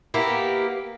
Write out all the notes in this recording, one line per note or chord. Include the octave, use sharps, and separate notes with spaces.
A#3 B3 E4 G4